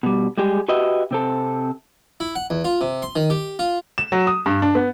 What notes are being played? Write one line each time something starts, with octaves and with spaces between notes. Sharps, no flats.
B2 G3
G3 G#3 G4 G#4
F#4 G4 B4 D#5 E5
C3 C4 A4
E4
F#5
E2
F4
C3
C6
D#3
G4
F4
E7
F#3
D#6
G2
D4
B3